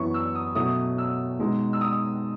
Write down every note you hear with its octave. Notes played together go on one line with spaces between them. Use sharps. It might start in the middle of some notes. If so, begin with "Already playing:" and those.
Already playing: F#2 E3 B3 E4 C#6
E6
D#6
B2 F#3 A3 C#4 D#6
E6
B2 G#3 D#4
E6
D#6